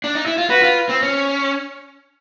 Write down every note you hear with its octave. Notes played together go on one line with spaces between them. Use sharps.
D4
D#4
E4
F4
F#4 B4
F4
C4
C#4